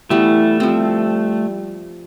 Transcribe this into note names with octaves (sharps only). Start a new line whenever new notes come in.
E3 G3 A3 B3 E4
F3 G3 C4